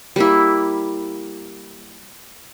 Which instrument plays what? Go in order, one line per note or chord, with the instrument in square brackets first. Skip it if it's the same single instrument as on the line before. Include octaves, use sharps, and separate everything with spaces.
[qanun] G3 A#3 E4